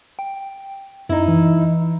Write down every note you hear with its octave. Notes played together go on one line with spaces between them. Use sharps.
G5
F#2 D#4 E4
E3